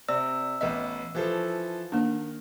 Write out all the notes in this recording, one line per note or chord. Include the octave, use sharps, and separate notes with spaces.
C3 D5 E6
A1 B3 D#5 E5
E3 F3 A4
D#3 A#3 D4